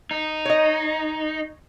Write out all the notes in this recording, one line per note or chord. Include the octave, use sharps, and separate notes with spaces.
D#4
C#5 D#5